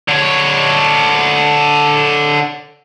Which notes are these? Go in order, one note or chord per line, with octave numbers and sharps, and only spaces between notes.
D3 C#5